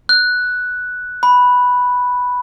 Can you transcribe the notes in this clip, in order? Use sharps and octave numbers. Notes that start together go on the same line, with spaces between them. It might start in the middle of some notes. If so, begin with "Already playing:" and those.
F#6
B5